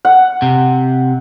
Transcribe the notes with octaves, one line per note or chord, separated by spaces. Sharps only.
F#5
C3